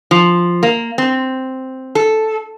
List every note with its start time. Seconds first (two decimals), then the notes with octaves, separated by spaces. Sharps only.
0.11 F3
0.63 A#3
0.98 C4
1.95 A4